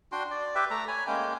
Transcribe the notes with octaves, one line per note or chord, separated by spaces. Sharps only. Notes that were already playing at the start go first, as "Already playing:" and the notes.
D4 F#4 G5 C6
D5
G4 B4 E5 G5
A3 A#5
C#5 G#5 B5
G#3 A#3 C#4 G5